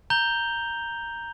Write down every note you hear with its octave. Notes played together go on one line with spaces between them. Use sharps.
A#5 G6 F7 G7